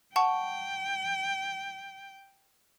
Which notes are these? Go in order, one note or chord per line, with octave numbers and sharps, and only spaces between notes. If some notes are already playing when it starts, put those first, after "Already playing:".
F#5 G5 A5 C#6